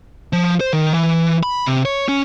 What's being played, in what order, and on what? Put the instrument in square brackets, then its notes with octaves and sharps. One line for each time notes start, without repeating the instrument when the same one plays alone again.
[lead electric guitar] F3
C5
D#3
E3
B5
C3
C#5
C#4